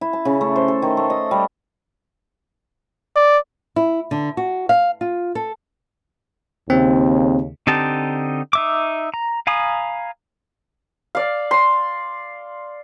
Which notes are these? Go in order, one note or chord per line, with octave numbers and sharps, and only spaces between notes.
E4
A5
C#3
A3
C5
A4
D#3
A3
D#5
G3
D5
E4
D3
F#4
F5
F4
A4
D#2 C#3 C4
D3 C4 D#4 G4 A5
D#4 E5 D6
A#5
F5 G#5 A#5 B5 D#6
D5 F5
C6